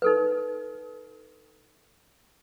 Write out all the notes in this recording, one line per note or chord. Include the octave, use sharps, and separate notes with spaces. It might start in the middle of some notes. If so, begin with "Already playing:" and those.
D#4 A4 B4